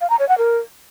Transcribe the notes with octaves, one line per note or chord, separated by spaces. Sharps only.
F5
A#5
C#5
F#5
A#4